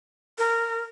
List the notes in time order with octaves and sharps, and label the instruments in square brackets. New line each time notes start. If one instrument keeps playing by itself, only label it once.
[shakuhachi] A#4